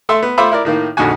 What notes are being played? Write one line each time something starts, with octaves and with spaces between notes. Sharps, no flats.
A3 A4 E5 C6
B3
A3 F4 C5 E5 B5 D6
E4 A#4 D5
A2 D#3 A#3
A#1 F2 D3 D#4 F#4 G#5